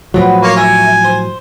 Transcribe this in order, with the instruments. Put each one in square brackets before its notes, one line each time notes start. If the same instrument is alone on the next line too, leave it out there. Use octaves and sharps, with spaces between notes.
[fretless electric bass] A2 F3 F#3 [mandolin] B3 C4 B4
[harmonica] A#3 C#5 [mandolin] F4
[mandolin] A#4 E5 C#6 [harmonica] G#5
[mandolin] C5